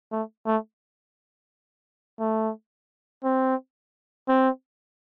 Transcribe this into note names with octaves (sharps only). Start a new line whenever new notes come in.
A3
A3
A3
C4
C4